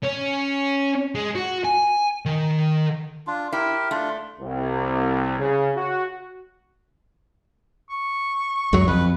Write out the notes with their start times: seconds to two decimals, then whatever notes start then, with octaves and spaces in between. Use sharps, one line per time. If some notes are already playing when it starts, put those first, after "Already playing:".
0.04 C#4
1.15 G#3
1.35 F#4
1.64 G#5
2.26 D#3
3.27 D4 F4
3.52 E4 G4 A#4
3.91 A3 D4 F4
4.40 C2
5.38 C#3
5.76 F#4
7.90 C#6
8.73 C#2 F#2 F#3
8.88 F2 B4